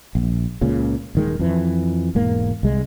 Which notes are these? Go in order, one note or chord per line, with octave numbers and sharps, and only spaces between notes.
A#1
C#2 A#2 C#3
D#1 D#3 G#3
F2 E3
E1 G#2 A#3
C2 G#3